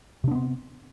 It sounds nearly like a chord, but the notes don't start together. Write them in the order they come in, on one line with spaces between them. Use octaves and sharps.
C3 D4 B3 C4